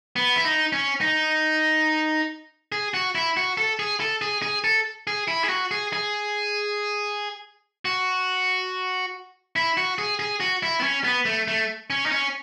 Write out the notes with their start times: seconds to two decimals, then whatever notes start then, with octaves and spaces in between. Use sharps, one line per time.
0.16 B3
0.36 E4
0.45 D#4
0.73 C#4
1.01 D#4
2.72 G#4
2.94 F#4
3.15 E4
3.37 F#4
3.57 A4
3.79 G#4
4.00 A4
4.22 G#4
4.42 G#4
4.64 A4
5.07 G#4
5.28 E4
5.44 G#4
5.49 F#4
5.71 G#4
5.93 G#4
7.85 F#4
9.56 E4
9.77 F#4
9.98 G#4
10.19 G#4
10.40 F#4
10.63 E4
10.80 B3
10.83 C#4
11.04 B3
11.25 A3
11.48 A3
11.90 C#4
12.06 D#4
12.11 C#4